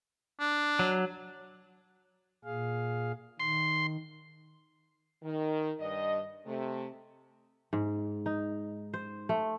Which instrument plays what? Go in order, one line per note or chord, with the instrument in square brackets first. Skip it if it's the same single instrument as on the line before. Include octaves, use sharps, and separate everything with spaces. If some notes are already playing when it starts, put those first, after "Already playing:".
[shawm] D4
[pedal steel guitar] F#3
[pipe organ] A#2 G#4 F5
[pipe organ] D#3 [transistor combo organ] C6
[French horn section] D#3
G2 D#5
C3 A3
[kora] G#2
D#4
C5
A3